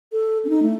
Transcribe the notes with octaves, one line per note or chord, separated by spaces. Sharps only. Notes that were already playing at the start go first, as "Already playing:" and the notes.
A4
C#4
D#4
A3